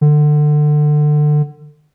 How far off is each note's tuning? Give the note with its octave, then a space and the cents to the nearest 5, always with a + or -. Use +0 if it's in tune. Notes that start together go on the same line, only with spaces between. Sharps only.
D3 +25